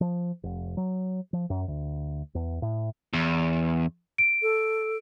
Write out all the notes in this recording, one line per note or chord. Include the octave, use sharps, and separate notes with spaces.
F3
F1
F#3
F3
F#2
D2
E2
A2
E2
D7
A4